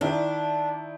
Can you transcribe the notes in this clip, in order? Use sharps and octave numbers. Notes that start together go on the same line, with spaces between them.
D#3 D4 E4